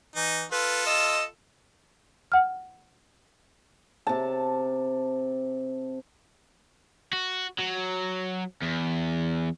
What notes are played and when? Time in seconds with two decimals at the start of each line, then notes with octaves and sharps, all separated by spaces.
0.16 E3 D#4
0.52 F4 A4 B4
0.86 D#5 E6
2.32 F#5 F6
4.07 C3 A5
7.13 F#4
7.59 F#3
8.62 E2